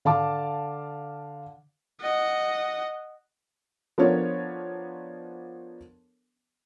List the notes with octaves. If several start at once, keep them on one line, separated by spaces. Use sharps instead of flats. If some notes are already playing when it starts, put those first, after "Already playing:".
D3 F5 A5 D6
D#5 F#5
F3 B3 D4 A4 A#4 C#5